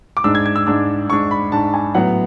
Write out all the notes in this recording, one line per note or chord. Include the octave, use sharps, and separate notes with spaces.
D6
G#2 G#3 D4 E6
G#6
G#6
E6
G#2 G#3 D4 E6
G#2 G#3 D4 C#6
B5
G#2 G#3 D4 A5
G#5
A2 F#3 B3 F#5